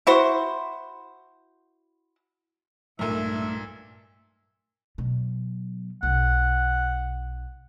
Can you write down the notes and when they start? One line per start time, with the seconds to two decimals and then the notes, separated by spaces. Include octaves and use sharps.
0.07 E4 F#4 C5
2.99 B1 G2 A#2 A3 E5 G#5
4.98 B2 F#3
6.03 B1 F#5